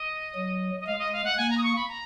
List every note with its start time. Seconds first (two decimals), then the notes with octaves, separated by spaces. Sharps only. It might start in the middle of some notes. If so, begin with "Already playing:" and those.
Already playing: D#5
0.35 F#3
0.80 D#5
0.87 G#3 F5
0.99 D#5
1.13 F5
1.24 F#5
1.37 A#3 G#5
1.50 A#5
1.57 D#6
1.63 C#6
1.76 B5
1.89 A#5